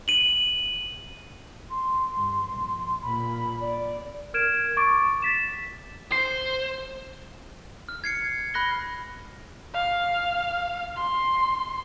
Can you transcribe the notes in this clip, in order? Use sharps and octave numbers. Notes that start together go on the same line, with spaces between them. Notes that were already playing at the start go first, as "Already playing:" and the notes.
D#7 F#7
C6
G2
A#1
A#2 B5
D5
A#4 F6 G#6 D7 E7
C#6 D6 A6 D7
A6 B6 E7
C5 C7
F6
G#6 C7 C#7
B5 F#6 A#6 G7
F5
C6